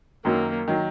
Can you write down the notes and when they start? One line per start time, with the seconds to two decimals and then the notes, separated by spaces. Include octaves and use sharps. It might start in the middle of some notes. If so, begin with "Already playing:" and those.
0.25 F#2 D#3 F#3 A#3
0.68 D#3 F#3